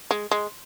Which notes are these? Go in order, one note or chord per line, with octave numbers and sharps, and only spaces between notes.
G#3
G#3